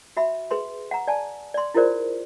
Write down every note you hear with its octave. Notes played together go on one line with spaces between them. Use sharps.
F#4 E5 B5
G#4 B4 C6
F#5 A#5
D5 G#5 A5
D5 C6
E4 F4 G#4 A#4 C5 D5